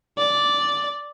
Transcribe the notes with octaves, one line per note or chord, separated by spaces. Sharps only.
D5